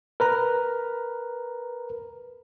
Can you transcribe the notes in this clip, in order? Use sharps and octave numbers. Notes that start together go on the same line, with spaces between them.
A#4 B4 A#5